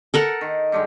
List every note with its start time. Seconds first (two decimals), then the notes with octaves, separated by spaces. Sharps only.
0.14 A4 A#4 F#5
0.41 D#3
0.72 G2 D3 G#3